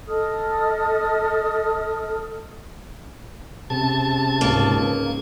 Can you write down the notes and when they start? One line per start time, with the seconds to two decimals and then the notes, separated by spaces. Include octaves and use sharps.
0.08 A4 D#5 D#6 F6
3.70 C3 C#4 G#4 A5
4.41 C#2 G#2 A#3